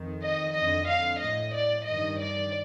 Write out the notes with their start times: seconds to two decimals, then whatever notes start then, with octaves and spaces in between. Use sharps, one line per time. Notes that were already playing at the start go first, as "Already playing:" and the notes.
Already playing: F2 D#3
0.22 D#5
0.54 F2 D3 D#5
0.87 F5
1.20 A2 D#5
1.54 D5
1.86 G2 D#3 D#5
2.19 D5